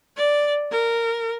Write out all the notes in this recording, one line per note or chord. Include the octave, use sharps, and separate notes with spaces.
D5
A#4